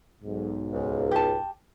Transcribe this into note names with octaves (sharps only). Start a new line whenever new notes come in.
B1 G#2
C#2
G4 A5